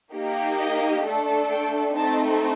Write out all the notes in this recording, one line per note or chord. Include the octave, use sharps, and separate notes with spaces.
A#3 D#4 G4
D#5
A3 D4 A4
G5
A3 C4 D#4 A5